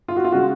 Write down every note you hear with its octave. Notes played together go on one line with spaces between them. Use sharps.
F4
F#4
F4
C#3 G#3 F#4